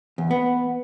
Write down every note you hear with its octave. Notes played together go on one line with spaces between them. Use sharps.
E2
B3